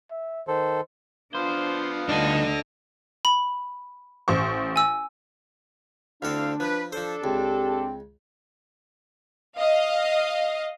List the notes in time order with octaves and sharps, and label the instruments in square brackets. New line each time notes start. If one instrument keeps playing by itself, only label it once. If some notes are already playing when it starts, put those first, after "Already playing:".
[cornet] E5
[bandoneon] D#3 A4 [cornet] C5
[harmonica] F3 B3 F5 [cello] D4 [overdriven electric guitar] C5
[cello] D2 D#5 [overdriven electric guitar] G3 D#4 [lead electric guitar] D4 A4
[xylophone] B5
[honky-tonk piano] A1 C5 C#6
[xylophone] G#5 E6
[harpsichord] D2 D3 A4 [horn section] C4 E4 F5 [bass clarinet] D4
[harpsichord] F3 [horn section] B4
[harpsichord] F3 C5 [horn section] D4 A4
[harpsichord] C#2 [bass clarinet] C4 [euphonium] G4
[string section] D#5 F5